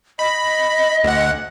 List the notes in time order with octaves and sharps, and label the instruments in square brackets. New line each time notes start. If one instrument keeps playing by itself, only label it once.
[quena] D#5 [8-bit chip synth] B5
[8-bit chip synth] D2 F#5